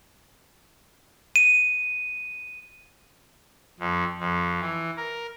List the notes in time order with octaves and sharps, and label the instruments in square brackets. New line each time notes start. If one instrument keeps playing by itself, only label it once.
[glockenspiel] D#7
[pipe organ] F2
F2
E3
A#4